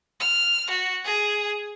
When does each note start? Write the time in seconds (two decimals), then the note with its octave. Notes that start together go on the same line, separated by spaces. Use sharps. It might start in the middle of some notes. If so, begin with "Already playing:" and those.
0.20 F6
0.70 F#4
1.04 G#4